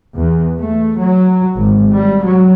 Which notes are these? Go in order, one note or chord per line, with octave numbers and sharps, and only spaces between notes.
E2
A3
F#3
G#1
G3
F#3